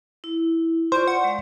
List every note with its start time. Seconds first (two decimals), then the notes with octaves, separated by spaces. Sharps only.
0.24 E4
0.92 F4 C5 D5 C6 C#6
1.08 F#5
1.24 G#3 F5